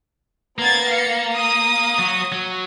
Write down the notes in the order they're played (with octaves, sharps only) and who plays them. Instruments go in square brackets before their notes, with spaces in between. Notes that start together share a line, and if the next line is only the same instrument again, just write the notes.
[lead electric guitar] A#3 [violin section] B3 G#6 A6
[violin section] F5 C#7
D#6
[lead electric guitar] F#3 F#4
F#3